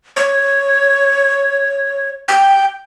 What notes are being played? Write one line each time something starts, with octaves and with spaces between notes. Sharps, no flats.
C#5
G5